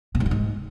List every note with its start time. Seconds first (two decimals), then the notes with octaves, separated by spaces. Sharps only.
0.15 B2
0.20 G#2
0.26 D3
0.31 G#2